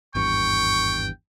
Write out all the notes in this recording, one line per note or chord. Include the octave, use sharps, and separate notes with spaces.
G#1 E2 G2 G5 C#6